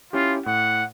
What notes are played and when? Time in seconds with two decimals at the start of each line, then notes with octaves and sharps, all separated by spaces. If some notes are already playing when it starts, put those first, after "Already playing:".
0.13 C#4 E4 F4 G4
0.46 A2 F#5